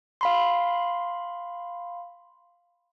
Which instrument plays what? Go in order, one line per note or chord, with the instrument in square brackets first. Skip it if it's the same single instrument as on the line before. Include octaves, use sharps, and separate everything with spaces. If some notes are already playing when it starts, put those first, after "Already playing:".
[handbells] F5 B5 C6